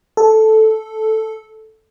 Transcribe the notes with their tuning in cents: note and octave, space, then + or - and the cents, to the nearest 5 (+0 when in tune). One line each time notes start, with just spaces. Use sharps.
A4 -5